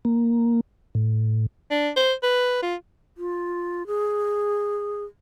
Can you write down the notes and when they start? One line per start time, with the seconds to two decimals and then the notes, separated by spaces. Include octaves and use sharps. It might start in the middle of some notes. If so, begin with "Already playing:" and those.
0.05 A#3
0.95 A2
1.71 D4
1.97 C5
2.23 B4
2.62 F4
3.17 F4
3.87 G#4